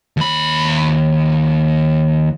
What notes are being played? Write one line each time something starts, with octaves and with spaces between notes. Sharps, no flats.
D#2 B5